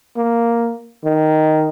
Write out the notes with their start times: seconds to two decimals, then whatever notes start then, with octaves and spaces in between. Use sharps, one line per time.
0.17 A#3
1.05 D#3